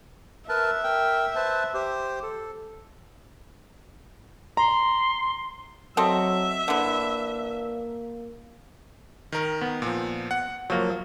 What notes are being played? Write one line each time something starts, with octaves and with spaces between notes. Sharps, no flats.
A#4 B4 E5 A5
A#4 G5
B4 C5 A5
G4 C5
A4
A#5 C6
F#3 C4 A4 D#5 E5
D3 E3 A#3
D#3 A#4
B3
A#2 F3
F#5
F3 F#3 A#3